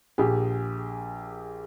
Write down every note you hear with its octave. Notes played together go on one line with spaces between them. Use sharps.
A#1 G4 G#4